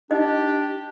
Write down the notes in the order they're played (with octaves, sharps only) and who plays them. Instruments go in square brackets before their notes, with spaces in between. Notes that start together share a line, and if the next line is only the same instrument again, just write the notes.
[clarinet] D4 [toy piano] D#4 D#5 [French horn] G4